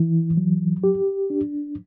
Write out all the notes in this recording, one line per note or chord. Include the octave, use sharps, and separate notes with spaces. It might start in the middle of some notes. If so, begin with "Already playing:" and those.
Already playing: E3 E4
F#3
G4
D4